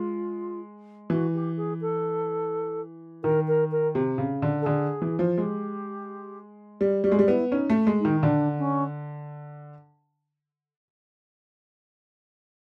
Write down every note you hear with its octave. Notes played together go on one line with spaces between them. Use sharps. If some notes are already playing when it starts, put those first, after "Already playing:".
Already playing: G#3 F4
E3 F#4
G4
G#4
A4
D#3 A#4
A#4
A#4
C3
C#3
D3
A4
D3 G#4
E3
F3
G#3 G4
G3
G3 F#4
G#3
G3
B3 E4
C#4 D#4
A3
G#3
D#4
D#3
D3 D4
C#4